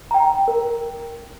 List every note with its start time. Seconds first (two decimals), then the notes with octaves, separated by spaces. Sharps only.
0.11 G5 A#5
0.48 A#4